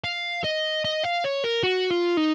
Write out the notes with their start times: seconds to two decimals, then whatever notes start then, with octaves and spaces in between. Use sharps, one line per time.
0.04 F5
0.44 D#5
0.85 D#5
1.04 F5
1.25 C#5
1.44 A#4
1.63 F#4
1.91 F4
2.17 D#4